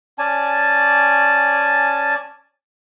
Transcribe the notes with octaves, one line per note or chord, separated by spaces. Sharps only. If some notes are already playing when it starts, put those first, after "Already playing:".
C#4 D5 G#5 A5